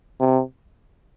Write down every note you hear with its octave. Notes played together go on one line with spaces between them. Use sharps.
C3